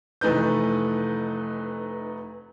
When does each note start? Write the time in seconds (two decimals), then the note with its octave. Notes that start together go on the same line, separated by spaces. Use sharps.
0.21 F1 E3 A3 D#4 B4 G6